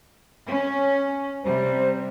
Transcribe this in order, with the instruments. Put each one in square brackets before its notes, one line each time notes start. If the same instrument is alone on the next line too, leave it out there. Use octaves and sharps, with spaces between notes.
[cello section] C#4
[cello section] C3 G3 [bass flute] C5